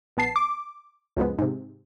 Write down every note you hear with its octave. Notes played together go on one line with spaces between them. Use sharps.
A#1 B3 A5 C7
D6
C#2 F#2 F3 G#3 B3
G#2 C3